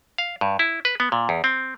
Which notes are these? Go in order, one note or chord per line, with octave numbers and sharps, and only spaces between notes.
F5
G2
E4
B4
B3
A#2
E2
C4